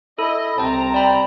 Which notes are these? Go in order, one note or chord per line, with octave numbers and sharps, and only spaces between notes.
E4 A4 D#5
C2 C3 C4 G5 A5 A#5
D5 G5 B5